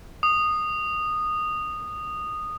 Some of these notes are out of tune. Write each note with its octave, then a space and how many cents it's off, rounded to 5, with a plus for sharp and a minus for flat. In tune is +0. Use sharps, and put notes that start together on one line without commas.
D#6 -15